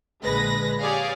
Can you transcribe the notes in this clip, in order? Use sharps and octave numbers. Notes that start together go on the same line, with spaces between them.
A#1 D3 G#3 B4 A#6
G4 G#4 C#5 D5 F5